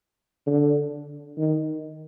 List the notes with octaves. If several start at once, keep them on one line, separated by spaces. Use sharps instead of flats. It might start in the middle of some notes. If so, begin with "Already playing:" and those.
D3
D#3